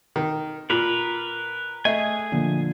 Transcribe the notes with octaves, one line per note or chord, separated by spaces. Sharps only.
D#3
A#2 A#4 B4
A3 G#4 D#5 G#5
A#2 D3 F3